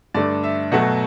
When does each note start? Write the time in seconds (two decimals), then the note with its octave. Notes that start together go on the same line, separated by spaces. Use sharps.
0.14 G2 D3 A3 D5
0.43 E5
0.72 B2 F#3 A3 F#5